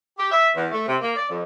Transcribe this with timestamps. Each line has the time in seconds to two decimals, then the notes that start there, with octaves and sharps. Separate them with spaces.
0.19 G4
0.32 E5
0.55 E2
0.71 A3
0.87 C3
1.00 A#3
1.16 D5
1.30 F2